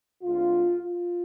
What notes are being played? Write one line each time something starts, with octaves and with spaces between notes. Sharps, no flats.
D2 D3 G#3 C4 F4
F4